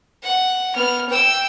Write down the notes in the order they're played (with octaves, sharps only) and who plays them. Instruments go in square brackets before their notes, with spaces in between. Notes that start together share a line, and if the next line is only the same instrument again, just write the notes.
[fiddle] F#5
B3 F6
G5 E6